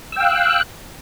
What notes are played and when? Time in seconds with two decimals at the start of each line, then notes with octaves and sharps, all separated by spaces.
0.12 E6
0.16 G5
0.20 F5
0.24 F#6